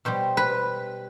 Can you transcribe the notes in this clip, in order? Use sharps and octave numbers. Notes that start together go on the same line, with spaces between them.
B2 G3 C5
B4